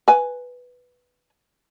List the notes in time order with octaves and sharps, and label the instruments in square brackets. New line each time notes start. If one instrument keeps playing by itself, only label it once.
[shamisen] B4 G#5